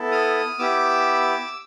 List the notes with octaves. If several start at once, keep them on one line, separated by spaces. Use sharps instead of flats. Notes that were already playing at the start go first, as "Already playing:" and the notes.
Already playing: B3 E4 A4
D#6 F6
B3 E4 G4 D6 E6